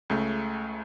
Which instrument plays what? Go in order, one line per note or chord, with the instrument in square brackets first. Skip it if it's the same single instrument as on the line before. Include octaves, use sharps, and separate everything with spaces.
[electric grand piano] C#2 C#3 A3